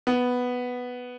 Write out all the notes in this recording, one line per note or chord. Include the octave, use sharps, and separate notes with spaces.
B3